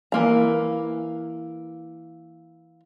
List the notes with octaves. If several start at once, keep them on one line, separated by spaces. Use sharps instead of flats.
E3 A#3 A#5